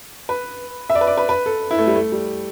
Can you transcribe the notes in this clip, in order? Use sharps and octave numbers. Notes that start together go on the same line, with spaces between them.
B4
E5
D5
B4
D5
B4
B4
A4
E4
A3
G3
A3
G3